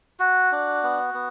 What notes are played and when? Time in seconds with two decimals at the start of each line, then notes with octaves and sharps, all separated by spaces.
0.20 F#4
0.52 D4
0.83 B3
1.14 B3